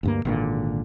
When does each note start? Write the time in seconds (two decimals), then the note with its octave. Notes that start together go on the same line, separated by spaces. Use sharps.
0.03 D2 G2 A#3
0.25 G#1 A#2 D3